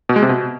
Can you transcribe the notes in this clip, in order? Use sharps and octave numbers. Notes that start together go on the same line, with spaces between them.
B2
G#3
C3
B2